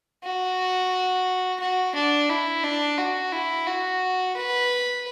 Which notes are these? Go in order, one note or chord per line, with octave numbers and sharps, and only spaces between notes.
F#4
F#4
D4
E4
D4
F#4
E4
F#4
B4